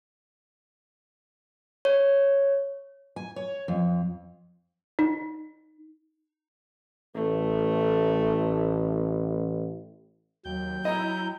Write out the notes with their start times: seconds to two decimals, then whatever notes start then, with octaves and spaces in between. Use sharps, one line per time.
1.85 C#5
3.16 G#5
3.36 C#5
3.68 F2
4.99 D#4
7.15 A1 A3
10.45 D#2 F#3 G5 G6
10.85 E4 D#5 A#5